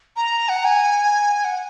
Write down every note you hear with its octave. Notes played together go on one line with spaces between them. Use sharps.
A#5
F#5
G#5
F#5